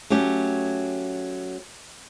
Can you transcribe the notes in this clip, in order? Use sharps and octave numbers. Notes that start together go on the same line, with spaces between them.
F#3 A3 C#4 G4